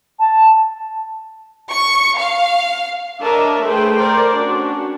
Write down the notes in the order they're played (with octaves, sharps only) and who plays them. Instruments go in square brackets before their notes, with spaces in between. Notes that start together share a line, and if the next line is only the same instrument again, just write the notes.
[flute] A5
[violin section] C#6
F5
[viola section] D4 A#4 C#5 D#5 E5 A5
A3 G#4 B4 C5 G5
A#4 C5 D5
C#4 D4 F#4